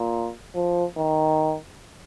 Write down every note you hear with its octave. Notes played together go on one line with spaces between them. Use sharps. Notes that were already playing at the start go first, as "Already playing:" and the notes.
Already playing: A#2
F3
D#3